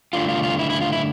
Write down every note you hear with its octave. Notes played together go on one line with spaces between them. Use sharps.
G2 D3 A3 D4 F4
F4
F4
E4
E4
F4
E4